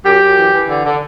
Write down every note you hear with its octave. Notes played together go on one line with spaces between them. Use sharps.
F#2 G4
F#2
E3
E3
D3
D3